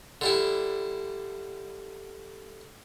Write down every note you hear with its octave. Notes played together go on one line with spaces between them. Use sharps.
D3 G3 E4